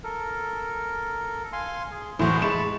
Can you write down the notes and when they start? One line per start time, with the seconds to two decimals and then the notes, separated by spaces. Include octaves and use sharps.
0.04 A4 A#4
1.53 F5 G#5 C6
1.91 G#4
2.19 E2 A2 F#4 C5
2.42 G#3 A5 B5 C#6 E7